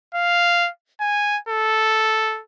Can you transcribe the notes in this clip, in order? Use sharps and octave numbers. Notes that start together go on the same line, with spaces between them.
F5
G#5
A4